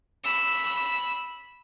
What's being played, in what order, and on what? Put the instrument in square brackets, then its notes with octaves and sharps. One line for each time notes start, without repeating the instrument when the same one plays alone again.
[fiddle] B5 E6